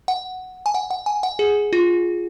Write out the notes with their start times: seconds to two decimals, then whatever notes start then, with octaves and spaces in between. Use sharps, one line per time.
0.08 F#5
0.66 G#5
0.74 F#5
0.91 F#5
1.06 G#5
1.23 F#5
1.39 G#4
1.73 F4